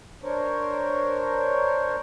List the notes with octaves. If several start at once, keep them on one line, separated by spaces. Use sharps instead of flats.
D4 A#4 C5 C#5